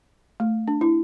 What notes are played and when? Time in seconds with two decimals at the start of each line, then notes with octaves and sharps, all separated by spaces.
0.40 A3
0.68 D4
0.81 E4